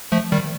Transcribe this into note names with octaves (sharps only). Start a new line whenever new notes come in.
F3 A3
D#3 G3